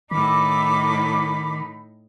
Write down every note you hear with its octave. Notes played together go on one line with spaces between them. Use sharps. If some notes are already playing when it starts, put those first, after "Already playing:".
A2 D#3 D#4 B5 D6